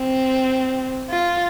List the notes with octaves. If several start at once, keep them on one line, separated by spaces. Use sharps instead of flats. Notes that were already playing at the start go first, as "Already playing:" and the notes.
Already playing: C4
F4